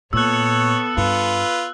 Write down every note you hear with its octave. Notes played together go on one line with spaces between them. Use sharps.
A#2 B3 A4 C#5 E6 F#6
G2 F4 B4